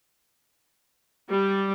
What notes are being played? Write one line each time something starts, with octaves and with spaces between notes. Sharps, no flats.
G3